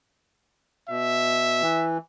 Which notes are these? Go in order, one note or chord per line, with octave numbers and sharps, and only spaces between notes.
B2 E5
E3